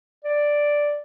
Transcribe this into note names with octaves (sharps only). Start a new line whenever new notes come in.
D5